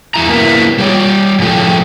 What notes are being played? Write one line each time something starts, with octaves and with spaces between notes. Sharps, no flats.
E2 E4 A#5
A#3 B3 E4 A#4
G3 G4 C#5 D5
A2 F3 F4 G4 A4 G5